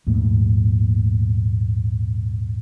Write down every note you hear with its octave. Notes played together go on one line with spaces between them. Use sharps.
A#1 D#2 G#2 A3